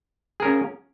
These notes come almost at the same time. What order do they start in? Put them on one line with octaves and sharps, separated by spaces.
G#4 A#4 C#4